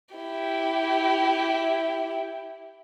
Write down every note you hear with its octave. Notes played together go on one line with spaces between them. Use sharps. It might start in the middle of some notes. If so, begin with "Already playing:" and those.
E4 G4